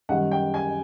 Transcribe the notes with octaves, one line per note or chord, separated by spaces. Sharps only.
F#2 D#3 G3 F#5
G5
G#5